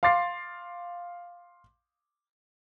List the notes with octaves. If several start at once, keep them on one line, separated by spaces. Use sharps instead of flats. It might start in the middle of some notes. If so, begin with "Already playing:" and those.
F5 C6 D6 A6 C7